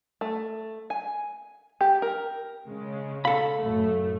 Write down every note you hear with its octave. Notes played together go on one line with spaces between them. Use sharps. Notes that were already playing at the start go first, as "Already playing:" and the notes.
A3
G#5
G4
A#4
C#3 G#3
A4 F5 B5
F#2 A2 A3